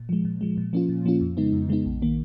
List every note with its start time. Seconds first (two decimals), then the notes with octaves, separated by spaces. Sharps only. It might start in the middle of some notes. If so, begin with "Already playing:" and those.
Already playing: A#2
0.09 F3 G#3
0.25 A#2
0.41 F3 G#3
0.58 A#2
0.73 F3 A#3 C#4 F4
0.89 A#2
1.06 F3 A#3 C#4 F4
1.21 F2
1.37 C#3 G#3 B3 D#4
1.53 F2
1.69 C#3 G#3 B3 D#4
1.86 A#1
2.02 D#3 A#3